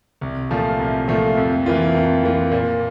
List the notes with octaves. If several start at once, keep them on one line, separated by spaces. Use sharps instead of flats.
C2
A#2 F3 A3
C2
A#2 F3 A3
F2
E3 A#3 F4
F2
E3 A#3 F4
A#2